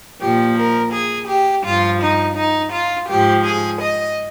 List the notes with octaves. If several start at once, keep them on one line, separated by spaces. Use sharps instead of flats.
A#2 F3 G4
A#4
G#4
G4
G2 F3 F4
D#4
D#4
F4
G#2 F3 G4
G#4
D#5